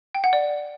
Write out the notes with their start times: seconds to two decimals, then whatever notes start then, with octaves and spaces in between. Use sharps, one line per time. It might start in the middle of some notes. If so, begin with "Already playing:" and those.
0.15 G5
0.24 F#5
0.33 D5